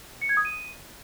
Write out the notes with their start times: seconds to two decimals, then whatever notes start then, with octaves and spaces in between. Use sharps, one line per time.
0.21 C#7
0.29 G#6
0.37 D#6
0.45 D#7